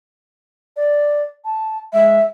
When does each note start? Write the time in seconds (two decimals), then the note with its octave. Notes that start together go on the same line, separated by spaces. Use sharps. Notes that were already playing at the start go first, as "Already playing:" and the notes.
0.77 D5
1.45 A5
1.93 G#3 E5